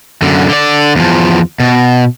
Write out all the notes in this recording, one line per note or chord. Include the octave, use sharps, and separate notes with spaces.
F#2 D3
D3 D5
E2 F3
B2